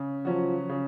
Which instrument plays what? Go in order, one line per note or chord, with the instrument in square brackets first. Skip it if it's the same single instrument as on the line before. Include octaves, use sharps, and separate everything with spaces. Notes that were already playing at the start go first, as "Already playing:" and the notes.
Already playing: [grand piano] C#3
[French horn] F3 [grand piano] F#3 C#4 F#4
[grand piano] C#3